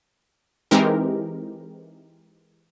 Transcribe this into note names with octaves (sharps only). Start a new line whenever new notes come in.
E3 G#3 C4 D#4 G4 A#4